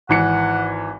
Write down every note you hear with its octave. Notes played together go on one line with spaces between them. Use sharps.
G#1 E3 F#5 C#7